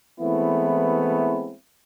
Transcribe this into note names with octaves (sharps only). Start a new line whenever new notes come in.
E3 G#3 A3 B3 C4 E4